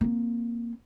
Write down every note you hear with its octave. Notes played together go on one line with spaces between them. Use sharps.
A#3 C4